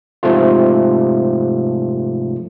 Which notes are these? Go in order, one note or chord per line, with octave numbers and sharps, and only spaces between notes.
G#2 C3 F3 A3 F4